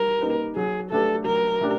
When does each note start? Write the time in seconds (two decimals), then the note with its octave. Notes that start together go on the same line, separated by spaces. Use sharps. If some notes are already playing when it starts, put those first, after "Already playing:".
Already playing: G3 D#4 A#4
0.21 A#3 D#4 G4 B4
0.56 F#3 G#4
0.91 A3 D4 G4 A4 B4
1.26 F#3 A#4
1.61 A3 D4 G4